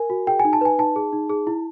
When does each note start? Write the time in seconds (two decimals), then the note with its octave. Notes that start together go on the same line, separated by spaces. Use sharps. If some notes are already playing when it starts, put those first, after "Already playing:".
Already playing: A#4 G#5
0.10 F#4
0.27 G#4 G5
0.40 G#5
0.45 D#4
0.53 A5
0.61 B4 G#5
0.78 D#4 A5
0.96 G#4
1.13 D#4
1.29 G#4
1.47 E4